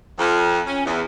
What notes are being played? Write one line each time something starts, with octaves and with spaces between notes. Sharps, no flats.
F2
C#4
E2